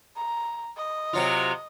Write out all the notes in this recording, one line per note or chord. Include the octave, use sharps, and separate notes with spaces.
A#5
D#5
C3 F#3 F4